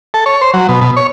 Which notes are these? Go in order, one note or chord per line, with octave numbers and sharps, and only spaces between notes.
A4
C#5
C5
F#3
B2
B2
C#5